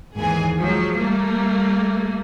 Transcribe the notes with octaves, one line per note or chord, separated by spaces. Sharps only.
D#2 G#2 E3 G#4 G#5
F3 F#3 G#3
G3 A3 A#3